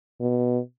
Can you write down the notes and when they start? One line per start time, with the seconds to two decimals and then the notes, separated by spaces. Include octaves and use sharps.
0.20 B2